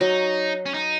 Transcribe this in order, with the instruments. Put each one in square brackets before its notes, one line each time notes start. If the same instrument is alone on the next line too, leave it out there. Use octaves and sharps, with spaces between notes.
[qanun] F#3 [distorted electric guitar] D#4
[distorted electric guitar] C#4
D#4